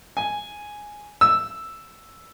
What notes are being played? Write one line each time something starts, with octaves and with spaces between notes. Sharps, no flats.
G#5
E6